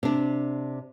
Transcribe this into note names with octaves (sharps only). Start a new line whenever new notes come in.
C3 D4